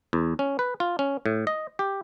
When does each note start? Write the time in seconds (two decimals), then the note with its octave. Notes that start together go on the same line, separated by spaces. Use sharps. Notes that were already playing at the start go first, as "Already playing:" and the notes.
0.13 E2
0.39 C#4
0.59 B4
0.80 F4
0.99 C#4
1.26 A2
1.47 D#5
1.79 G4